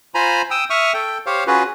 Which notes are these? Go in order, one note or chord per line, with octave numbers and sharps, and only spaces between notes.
F4 C5 G#5 A#5 B5
G5 D#6 E6
E5 C#6 D#6 F6
A4 G5
G4 C5 C#5 F5
C#4 F4 F#4 G#4 B4